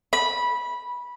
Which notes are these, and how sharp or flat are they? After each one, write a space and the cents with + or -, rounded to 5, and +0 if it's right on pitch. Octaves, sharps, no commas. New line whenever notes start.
B5 -15